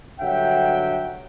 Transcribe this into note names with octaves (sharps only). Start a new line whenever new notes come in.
G2 D3 F#3 E5 F#5 G5